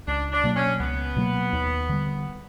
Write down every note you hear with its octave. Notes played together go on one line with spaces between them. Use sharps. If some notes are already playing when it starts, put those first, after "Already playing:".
C#2 D4
D4
B2 F#3 A#3
C#4
C#2 B3
B2 F#3 A#3
D#2
D3 G3